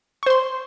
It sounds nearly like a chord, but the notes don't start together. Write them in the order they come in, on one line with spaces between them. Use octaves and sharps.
C#6 C5 C6